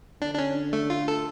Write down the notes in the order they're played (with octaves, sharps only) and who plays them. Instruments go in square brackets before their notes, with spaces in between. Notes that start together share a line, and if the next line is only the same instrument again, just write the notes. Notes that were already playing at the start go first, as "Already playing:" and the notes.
[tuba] D3 [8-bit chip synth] D4
[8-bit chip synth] D4
C#4
A3
F4
A4